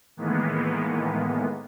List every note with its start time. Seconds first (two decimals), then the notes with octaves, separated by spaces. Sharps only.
0.17 A2 D#3 E3 G#3 A#3 B3